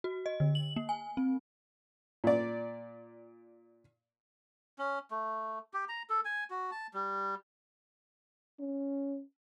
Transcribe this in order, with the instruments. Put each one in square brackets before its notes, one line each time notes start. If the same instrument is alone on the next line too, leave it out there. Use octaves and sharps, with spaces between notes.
[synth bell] F#4
D#5
D3
F#7
A#3
G#5
C4
[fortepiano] A#2 D5
[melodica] C#4
A3
G4
A#5
A4
G#5
F#4
A5
G3
[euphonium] C#4